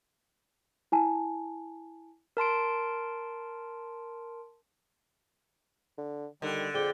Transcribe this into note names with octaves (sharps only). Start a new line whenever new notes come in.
E4 G#5 A5
A#4 A5 C6 D7
D3
D3 D#3 G3
F2 G#4 D5 G5 G7